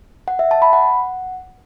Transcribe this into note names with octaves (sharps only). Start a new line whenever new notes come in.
F#5
E5
A5
B5
F#5